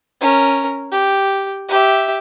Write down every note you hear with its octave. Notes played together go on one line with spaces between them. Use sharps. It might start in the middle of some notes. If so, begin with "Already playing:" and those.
C#4 A#4
G4
G4 E5